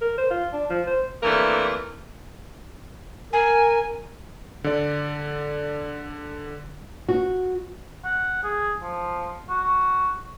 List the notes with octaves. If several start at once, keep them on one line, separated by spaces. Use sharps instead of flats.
A#4
C5
F4
D4
F3
C5
C3 E3 A3 A#3 D4 A#4
A#4 G#5
D3 D5
F#4
F#5
G#4
F3
F#4